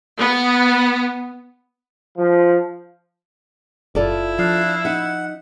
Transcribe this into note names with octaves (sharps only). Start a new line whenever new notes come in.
B3
F3
F#1 E4 F4 A4 D5
F3 D4 F5
D#4 E5 F#5